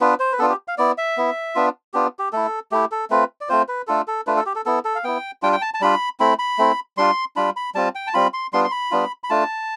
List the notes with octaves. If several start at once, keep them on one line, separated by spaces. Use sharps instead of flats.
B3 D4 F4 B4
C5
B4
B3 D4 F4 A4
G4
F5
B3 E4 D5
E5
B3 E4
B3 D4 F4
B3 D4 F4 G4
G4
A3 E4 A4
A3 E4 G4
A4
A3 C4 F4 B4
D5
A3 C4 F4 C5
B4
A3 D4 F4 A4
A4
A3 D4 F4 B4
A4
G4
A4
B3 E4 A4
A4
F5
B3 E4 G5
G3 D4 F4 G5
G5
A5
A5
G3 D4 F4 B5
A3 C4 E4 B5
B5
A3 C4 E4
G3 D4 F4 C6
G3 D4 F4 B5
B5
G3 C4 F4 A5
G5
A5
G3 C4 F4 B5
C6
G3 B3 D4 F4 C6
C6
B5
G3 B3 D4 F4
B5
A3 D4 F4 A5